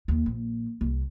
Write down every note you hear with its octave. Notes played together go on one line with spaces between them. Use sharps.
D#2
A#1
C2